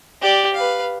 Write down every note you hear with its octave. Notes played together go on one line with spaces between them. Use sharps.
G4 D5
B4 F5